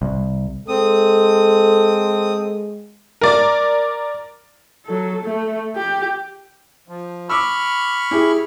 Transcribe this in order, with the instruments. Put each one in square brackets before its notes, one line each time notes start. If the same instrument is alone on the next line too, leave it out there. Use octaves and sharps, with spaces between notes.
[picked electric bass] C2
[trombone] G#3 [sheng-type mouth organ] C4 D#6 [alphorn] A4
[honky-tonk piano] A#4 D5
[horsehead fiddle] F#3 A4
A3
G4
[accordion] F3
[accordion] B5 C#6 F6 [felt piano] D6 E6
[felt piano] E4 G4 G#4